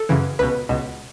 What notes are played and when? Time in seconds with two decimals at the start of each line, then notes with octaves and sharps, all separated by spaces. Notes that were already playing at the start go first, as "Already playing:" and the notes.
Already playing: A4
0.09 F#2 C#3 E3
0.39 C#2 B2 B4
0.69 C#2 B2